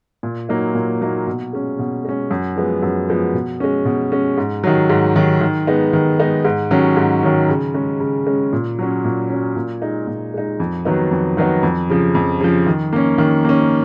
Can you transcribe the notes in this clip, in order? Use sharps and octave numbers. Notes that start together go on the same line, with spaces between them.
A#2
F#3 A#3 D#4
A#2
F#3 A#3 D#4
B2
G#3 C#4
B2
G#3 C#4
F#2
F3 G#3 B3
F#2
F3 G#3 B3
B2
G#3 C#4
B2
G#3 C#4
G#2
D#3 F#3
G#2
D#3 F#3
D#3
G#3 B3 D#4
D#3
G#3 B3 D#4
G#2
D#3 F#3 C#4
G#2
D#3 F#3 C#4
C#3
G#3 C#4
C#3
G#3 C#4
A#2
F#3 C#4
A#2
F#3 C#4
A#2
G#3 D#4
A#2
G#3 D#4
F2
D#3 F#3 B3 D#4
F2
D#3 F#3 B3 D#4
F2
C#3 F3
F2
C#3 F3
D#3
A#3 C#4
D#3
A#3 C#4